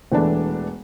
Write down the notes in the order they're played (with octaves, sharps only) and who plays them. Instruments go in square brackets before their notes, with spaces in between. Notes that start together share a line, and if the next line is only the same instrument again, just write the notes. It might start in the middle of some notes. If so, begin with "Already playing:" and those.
[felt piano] E1 E3 A3 D4